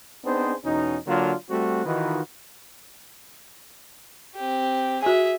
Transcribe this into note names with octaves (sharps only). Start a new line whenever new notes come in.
B3 C4 D4 D#4 G#4 C5
E2 B2 C#4 D#4
D3 F#3 A#3 D4 F4
G3 A3 C4 F#4
D#3 E3 D#4 F4 F#4 B4
C4 G4
F#4 G#4 E5 G#5